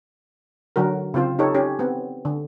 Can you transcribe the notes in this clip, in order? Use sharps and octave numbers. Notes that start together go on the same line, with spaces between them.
D3 F#3 F#4 A#4
C#3 C4 F4 C5
D#4 G4 A4 C#5
C#4 G4
B3 C4
D3